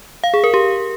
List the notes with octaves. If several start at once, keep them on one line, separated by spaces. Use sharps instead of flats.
F5
G#4
A#4
G4